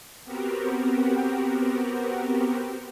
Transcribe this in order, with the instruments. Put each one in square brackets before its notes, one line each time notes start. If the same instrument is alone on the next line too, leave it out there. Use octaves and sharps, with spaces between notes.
[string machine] B3 C4 F#4 G4 A#4